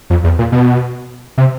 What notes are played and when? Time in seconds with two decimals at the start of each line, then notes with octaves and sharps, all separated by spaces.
0.10 F2
0.24 E2
0.39 A#2
0.52 B2
1.38 C3